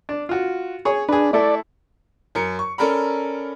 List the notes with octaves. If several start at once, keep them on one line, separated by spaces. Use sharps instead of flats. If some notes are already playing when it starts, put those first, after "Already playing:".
D4
F4 F#4
G#4 C#5
D4 G#4 B4
A3 E4 A4 D5
F#2 A#4 C#7
C#6
C#4 A4 A#4 D5 A#5 B5